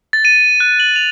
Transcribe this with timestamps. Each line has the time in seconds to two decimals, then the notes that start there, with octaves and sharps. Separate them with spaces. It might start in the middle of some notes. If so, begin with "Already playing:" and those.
0.13 A6
0.25 D#7
0.60 F#6
0.80 F#7
0.96 F7